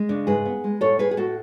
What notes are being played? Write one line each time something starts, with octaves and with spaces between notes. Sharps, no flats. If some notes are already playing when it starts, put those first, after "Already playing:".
Already playing: G#3
C#3 D4
G#2 G#4 B4
B3
G#3
A2 A4 C#5
A2 G#4 B4
G#4
A2 F#4 A4